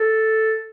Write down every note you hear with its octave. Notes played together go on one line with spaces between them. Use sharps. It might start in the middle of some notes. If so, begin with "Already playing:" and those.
Already playing: A4